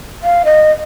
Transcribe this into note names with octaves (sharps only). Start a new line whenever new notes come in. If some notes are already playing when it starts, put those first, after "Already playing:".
F5
D#5